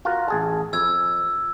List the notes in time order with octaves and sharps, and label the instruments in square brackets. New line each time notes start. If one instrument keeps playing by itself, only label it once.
[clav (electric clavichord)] F4 F#4 A#4
A1 G#4 A5
[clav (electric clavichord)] F2 [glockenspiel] E6 G#6